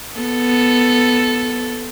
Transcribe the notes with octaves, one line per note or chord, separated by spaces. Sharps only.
B3 A4